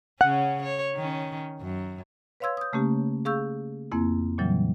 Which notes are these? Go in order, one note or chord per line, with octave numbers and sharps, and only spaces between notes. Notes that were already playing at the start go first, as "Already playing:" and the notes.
C#3 C#4 F#5
C#5
D#3 C#4
F#2
B4 C#5 F5 C6 E6 G#6
D#6 G6
C#3 A3 A#3 C#4 G4
G#4 F5 C#6 E6 G6
F2 A#3 C4 E4
A#2 C#3 E3 F#3 G3